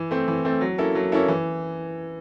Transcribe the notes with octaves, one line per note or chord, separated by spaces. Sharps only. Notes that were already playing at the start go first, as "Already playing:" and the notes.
Already playing: E3
A3 C4
E3
A3 C4
F#3
A#3 C#4 E4 A4
F#3
A#3 C#4 E4 A4
E3